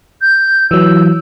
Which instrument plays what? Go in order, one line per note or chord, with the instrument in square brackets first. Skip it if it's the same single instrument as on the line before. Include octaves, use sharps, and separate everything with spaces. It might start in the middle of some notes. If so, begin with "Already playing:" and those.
[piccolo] G6
[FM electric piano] E3 F#3 [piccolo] E6